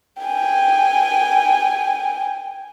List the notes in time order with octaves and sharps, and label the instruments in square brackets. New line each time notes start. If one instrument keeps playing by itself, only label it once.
[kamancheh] G5 G#5